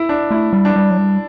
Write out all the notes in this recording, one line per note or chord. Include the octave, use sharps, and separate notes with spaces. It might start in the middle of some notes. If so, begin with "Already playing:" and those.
Already playing: E4
D4
A3 E4
G3
D4
G3
F#3
G3